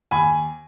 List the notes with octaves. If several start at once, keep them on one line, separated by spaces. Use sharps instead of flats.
D#2 G#5 B5